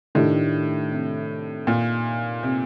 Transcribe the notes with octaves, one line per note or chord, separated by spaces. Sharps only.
A2 D#3 A3 D4 G4
C3
A#2
C3